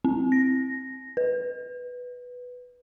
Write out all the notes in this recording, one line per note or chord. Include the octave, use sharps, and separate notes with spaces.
C4
A#6
B4